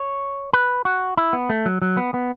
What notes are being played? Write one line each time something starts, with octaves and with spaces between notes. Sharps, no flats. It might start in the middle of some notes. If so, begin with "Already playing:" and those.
Already playing: C#5
B4
F#4
E4
B3
A3
F#3
F#3
B3
B3